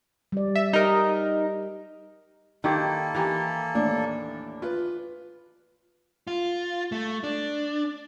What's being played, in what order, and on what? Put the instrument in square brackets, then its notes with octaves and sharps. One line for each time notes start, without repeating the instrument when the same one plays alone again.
[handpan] G3 D5
[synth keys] E5
[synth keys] D#4 A#4 [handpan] G4 D#5
[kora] D#3 E4 G4 [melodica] A#3 A4
[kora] E3 [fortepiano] G4 G#5 A#5
[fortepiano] D#2 A2 D4
F4 B4
[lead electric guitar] F4
A3
D4